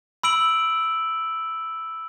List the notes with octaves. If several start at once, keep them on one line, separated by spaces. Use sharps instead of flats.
B5 E6 D7 F#7